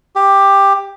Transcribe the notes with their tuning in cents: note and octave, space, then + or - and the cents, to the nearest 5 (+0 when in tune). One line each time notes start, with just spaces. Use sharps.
G4 +10